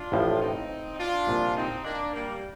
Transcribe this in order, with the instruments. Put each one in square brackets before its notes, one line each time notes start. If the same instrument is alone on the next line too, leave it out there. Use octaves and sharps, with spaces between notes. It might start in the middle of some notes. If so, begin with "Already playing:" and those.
Already playing: [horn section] D4 F4
[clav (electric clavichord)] A1 A2 F3
[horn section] C4 D#4
D4 F4
[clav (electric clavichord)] C2 A#2 F3 A#3
[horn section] C4 D#4
A#3 D4
G3 A#3